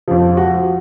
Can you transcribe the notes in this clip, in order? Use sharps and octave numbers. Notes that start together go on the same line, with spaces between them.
F2 F3
F#4